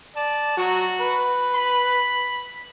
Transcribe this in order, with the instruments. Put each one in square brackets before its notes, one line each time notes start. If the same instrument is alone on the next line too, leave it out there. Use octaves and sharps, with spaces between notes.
[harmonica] D5 [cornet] A5
[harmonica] F#3 [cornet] F#4
[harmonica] B4
[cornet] B5